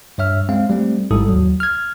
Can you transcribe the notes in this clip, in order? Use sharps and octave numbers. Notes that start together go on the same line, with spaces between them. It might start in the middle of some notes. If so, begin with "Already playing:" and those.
G2 C#5 E5 F6
G#3 C4 F5
G3 A3 C4
A1 G#2 G3 E4 A4 D#6
D#2 F#3
F6 G#6